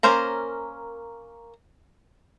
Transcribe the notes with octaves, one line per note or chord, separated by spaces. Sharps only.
A#3 C#4 A#4 C5 A#5